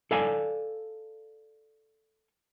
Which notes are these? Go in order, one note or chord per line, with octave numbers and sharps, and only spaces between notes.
A4 D5 F5 G#5